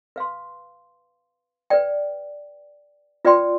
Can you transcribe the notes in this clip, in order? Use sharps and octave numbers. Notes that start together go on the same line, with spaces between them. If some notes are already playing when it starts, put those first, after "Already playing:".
B4 F5 C6
B4 D5 G5
F4 B4 D5 G5 C6